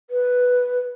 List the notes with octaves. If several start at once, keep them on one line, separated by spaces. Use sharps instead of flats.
B4